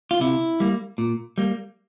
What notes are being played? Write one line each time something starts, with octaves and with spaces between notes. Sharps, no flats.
F4
C3 E4
G3 A#3
A#2
G3 A#3